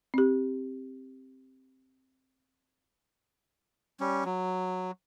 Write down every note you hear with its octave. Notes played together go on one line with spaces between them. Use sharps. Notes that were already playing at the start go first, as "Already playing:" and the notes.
C4 G4
G3 C#4
F#3